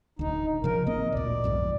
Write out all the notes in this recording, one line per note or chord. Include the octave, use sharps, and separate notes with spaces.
D1 D2 D#4
C#3 F3 A#4
A1 A#3 C4 D#5
D2 A#2 D5
B1 F2 G#2